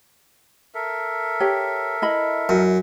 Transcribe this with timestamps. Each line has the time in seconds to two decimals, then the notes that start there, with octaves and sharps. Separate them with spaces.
0.75 A4 A#4 E5
1.40 G4 C#5
2.02 E4 D#5 B5
2.49 F#2